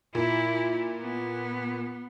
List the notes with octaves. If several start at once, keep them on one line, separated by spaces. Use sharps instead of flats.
A#2 E4
B3